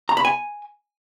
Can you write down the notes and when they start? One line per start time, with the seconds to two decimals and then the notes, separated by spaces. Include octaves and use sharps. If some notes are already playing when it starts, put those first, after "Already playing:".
0.09 A#5
0.17 B5
0.25 G#5